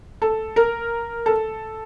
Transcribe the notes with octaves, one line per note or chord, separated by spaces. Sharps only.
A4
A#4
A4